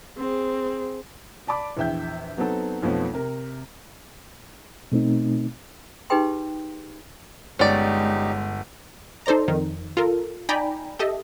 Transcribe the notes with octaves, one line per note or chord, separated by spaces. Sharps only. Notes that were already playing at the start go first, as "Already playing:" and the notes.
C4 G#4
D5 A5 B5 D6
A#1 E2 E5 G5 G6
F#3 B3 C4 D#4 A4
B1 F2 F3 A3 B3 C#5
C3 A#4
B2 A3 C4 D#4
D#4 G4 G#4 B4 G5 C6
G1 G#3 C#4 D#4 G4 D5
D#4 A4 C5 D5 A#5
F2 D#3
F4 A4 A#4
D#4 D5 G5 G#5 A#5 B5
G4 A4 D#5 E5